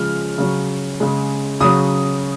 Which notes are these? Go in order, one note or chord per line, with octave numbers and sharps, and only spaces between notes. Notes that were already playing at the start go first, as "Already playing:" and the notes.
Already playing: C#3 F3 G#3 F6
C#3 F#3
C#3 G#3
C#3 F#3 D#6